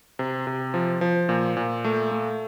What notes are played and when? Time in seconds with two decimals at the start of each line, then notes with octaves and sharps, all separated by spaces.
0.19 C3
0.47 C3
0.74 F3
1.01 F3
1.29 A#2
1.57 A#2
1.85 A3
2.12 A3